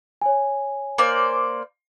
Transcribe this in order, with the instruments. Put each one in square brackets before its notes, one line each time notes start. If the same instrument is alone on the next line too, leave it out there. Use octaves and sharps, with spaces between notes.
[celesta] C#5 G#5
[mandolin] A#3 C5 D5